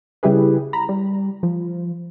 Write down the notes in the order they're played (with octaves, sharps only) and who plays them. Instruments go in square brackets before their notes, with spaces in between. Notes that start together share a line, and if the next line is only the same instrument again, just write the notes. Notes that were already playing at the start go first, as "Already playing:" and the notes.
[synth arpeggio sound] C#3 G3 E4 G4 G#4 B4
A#5 B5
G3
F3